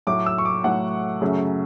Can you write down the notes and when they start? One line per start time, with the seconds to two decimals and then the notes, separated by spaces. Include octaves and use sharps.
0.07 A2 F#3 A3 D6
0.26 E6
0.38 C#6
0.45 D6
0.64 A2 F#3 A3 F#5
1.21 F#2 C#3 F#3 A3